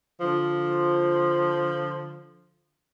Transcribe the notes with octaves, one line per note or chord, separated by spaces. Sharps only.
D3 F3